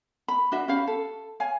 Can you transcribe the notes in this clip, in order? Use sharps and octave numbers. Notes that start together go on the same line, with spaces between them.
B5
D4 F#4 E5
C#4 G4 F5 B5
A4
C#5 F5 G#5